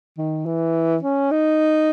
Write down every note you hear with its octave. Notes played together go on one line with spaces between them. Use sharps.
D#3
E3
C#4
D#4